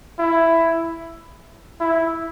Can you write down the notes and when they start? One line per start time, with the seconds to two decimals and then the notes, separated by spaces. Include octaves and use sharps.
0.19 E4
1.80 E4